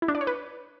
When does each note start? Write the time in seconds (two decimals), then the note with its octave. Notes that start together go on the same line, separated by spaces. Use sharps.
0.02 E4
0.08 D4
0.15 D5
0.21 C#5
0.27 B4